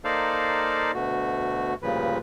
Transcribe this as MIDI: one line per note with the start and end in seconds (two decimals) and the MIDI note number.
0.04 0.91 58
0.04 0.91 63
0.04 0.91 69
0.04 0.91 72
0.04 0.91 74
0.04 0.91 77
0.94 1.74 38
0.94 1.74 47
0.94 1.74 57
0.94 1.74 66
1.82 2.18 38
1.82 2.18 43
1.82 2.18 46
1.82 2.18 49
1.82 2.18 53
1.82 2.18 71